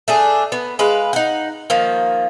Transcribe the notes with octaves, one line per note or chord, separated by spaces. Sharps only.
A3 D4 G#4
B3
G#3 B4 F5
D#4 F#5
D#3 F3 A#3